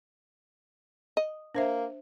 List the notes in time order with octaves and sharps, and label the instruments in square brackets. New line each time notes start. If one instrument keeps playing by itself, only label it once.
[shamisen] D#5
[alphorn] A#3 [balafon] D4 C5 E5